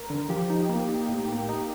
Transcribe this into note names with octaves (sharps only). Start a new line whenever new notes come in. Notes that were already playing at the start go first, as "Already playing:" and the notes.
Already playing: A#4
D3
F3 G4
D#4
A#3
D#4
A2
A#3
D#4